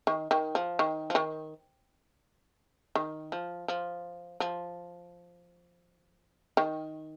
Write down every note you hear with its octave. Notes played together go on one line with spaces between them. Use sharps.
D#3
D#3
F3
D#3
F3
D#3
D#3
F3
F3
F3
D#3